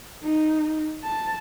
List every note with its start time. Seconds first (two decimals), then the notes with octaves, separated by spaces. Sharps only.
0.23 D#4
1.04 A5